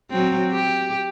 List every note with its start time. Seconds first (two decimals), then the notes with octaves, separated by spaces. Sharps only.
0.10 F#3 C4
0.51 G4